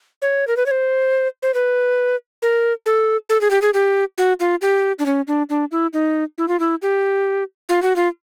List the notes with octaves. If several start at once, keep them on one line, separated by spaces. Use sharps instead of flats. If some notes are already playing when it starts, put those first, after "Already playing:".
C#5
A#4
B4
C#5
C5
C5
B4
A#4
A4
A4
G#4
G4
G#4
G4
F#4
F4
G4
D4
C#4
D4
D4
E4
D#4
E4
F4
E4
G4
F4
F#4
F4